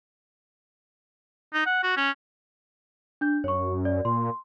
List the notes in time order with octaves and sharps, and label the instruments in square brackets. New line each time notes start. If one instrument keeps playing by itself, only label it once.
[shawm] D#4
F#5
F#4
C#4
[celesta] D4 G6
[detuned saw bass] F#2 [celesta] C#5 C#6
[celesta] D5
[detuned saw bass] A#2 [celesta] C6